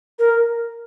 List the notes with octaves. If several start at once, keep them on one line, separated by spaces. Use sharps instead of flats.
A#4